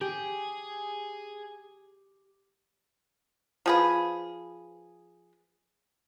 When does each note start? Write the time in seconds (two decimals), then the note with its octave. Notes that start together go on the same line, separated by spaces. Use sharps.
0.01 G4 G#4
3.66 F3 G#4 B4